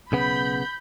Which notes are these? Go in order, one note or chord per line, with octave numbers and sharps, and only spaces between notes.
B1 C#3 B3 B5 G6